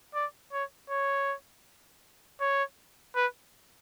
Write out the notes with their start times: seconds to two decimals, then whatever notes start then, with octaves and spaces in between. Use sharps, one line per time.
0.15 D5
0.53 C#5
0.90 C#5
2.41 C#5
3.15 B4